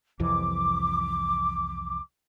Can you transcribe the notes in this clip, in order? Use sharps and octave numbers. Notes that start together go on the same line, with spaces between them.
C2 F2 E3 D6